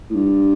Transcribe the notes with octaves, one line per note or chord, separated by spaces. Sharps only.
A2
G2